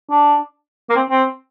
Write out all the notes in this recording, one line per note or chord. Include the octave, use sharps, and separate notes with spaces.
D4
A#3
C4
C4